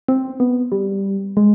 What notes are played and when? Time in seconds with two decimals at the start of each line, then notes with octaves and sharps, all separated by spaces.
0.08 C4
0.40 B3
0.72 G3
1.37 G#3